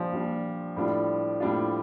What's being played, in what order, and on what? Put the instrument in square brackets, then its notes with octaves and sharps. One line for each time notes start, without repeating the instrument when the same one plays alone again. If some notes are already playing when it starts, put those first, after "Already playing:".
Already playing: [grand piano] A#2 G3 D4 [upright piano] F3
[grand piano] A#2 G3 D4
A2 G3 D4 F4
A2 G3 D4 F4